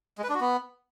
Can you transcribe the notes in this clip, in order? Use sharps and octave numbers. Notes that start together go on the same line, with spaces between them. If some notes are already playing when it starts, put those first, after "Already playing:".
G#3
B4
D4
F#4
B3